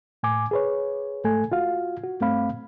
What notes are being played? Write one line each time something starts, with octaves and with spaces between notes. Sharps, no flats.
A2 G#5 D6
G#4 B4 C#5
G#2 A3 A4 G#5
F4 F#4 F5
F#4
G2 A3 C4 F5 B5